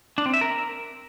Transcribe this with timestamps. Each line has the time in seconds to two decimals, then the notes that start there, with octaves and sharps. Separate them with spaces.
0.18 D4
0.26 C4
0.33 E5
0.41 A#4